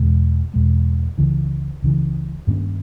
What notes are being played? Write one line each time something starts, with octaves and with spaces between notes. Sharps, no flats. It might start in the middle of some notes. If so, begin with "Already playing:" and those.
Already playing: E2 B2 G#3
E2 B2 G#3
C#2 C#3 E3
C#2 C#3 E3
G2 D#3 A#3 C#4